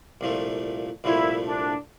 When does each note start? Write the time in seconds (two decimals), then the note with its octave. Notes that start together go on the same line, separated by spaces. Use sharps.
0.21 C2 A#2 F3 A3
1.04 C2 A#2 F3 A3 E4
1.47 D4